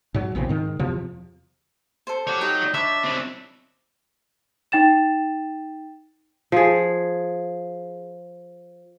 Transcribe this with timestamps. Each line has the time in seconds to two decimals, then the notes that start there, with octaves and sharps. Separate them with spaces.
0.14 G#2 F#3
0.35 A#1 E2 C#3 C4
0.49 G#2 D#3
0.79 E2 C3 F3
2.07 A4 C5
2.27 G4 C#5 F#5
2.41 D#4 G4
2.74 D4 C#5 D#5 E5 B5
3.04 C4 E4
4.72 D#4 G5 A6 E7
6.52 F3 G#4